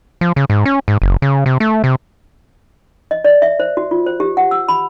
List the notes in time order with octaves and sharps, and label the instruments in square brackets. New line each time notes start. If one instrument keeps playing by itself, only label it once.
[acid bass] F3
C#3
G#2
C#4
G#2
F#1
C#3
C3
A3
C3
[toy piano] D#5
D5
E5
C5
F#4
F4
C5
G4
F#5
E6
B5